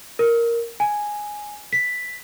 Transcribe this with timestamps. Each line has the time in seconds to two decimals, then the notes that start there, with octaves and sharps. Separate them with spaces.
0.19 A#4
0.80 G#5
1.73 B6